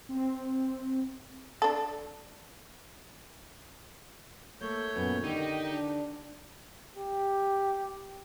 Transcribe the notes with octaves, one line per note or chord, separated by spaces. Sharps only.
C4
D4 A4
A3 A#3 C#5 G6
F#2 A#2 B3
D3 D#3 D#4 G4
D4
G4